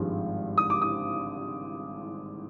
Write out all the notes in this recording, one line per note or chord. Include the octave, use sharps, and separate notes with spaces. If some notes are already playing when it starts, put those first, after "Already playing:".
Already playing: G#1 G2 F3 G#3
D#6
D6
D#6